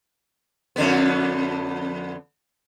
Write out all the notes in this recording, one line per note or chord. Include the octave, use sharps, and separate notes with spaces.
F2 D3 B3